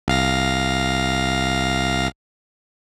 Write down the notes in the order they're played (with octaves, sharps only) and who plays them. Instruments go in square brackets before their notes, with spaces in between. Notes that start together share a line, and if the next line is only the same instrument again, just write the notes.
[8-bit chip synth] C2 F5 A#6